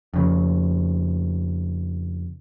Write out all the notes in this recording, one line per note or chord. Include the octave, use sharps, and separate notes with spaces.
F2 C#3